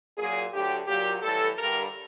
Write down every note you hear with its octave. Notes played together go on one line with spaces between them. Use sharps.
A#2 F#3 G#4
D2 D3 F#3 G4
A#2 F#3 G4
A2 E3 G3 A4
G2 D3 G3 A#4